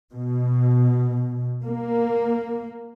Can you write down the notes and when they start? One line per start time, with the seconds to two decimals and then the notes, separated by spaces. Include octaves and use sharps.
0.12 B2
1.66 A#3